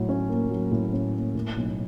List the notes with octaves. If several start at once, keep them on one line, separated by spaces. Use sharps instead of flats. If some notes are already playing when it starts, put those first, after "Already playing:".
Already playing: A2 F#3
C#4
A#3
F#3
A2
C#4
A#3
A2
B1